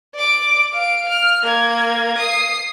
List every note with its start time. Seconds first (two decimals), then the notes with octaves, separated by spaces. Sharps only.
0.15 D5 D6
0.74 F5 D7
1.09 F6
1.43 A#3 G#6
2.18 D#6 C7